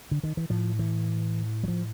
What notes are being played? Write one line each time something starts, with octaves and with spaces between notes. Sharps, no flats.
D3
D#3
E3
A2 F3
E3
F#3
F3